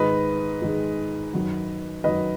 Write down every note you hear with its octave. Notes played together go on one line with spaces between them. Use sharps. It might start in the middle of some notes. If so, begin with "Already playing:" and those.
Already playing: G#2 D#3 G#3 B4 D#5
G#2 D#3 G#3
F#2 D#3 F#3
F#2 D#3 F#3 B4 D#5